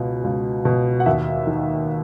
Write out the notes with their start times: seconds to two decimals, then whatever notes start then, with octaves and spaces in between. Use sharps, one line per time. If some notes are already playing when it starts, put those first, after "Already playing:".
Already playing: C#2 B2
0.24 C#2
0.65 B2
1.00 F#5
1.06 D#2 E5
1.47 D#3